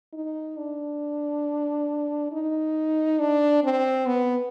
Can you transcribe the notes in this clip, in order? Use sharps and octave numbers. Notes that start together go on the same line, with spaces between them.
D#4
D4
D#4
D4
C4
B3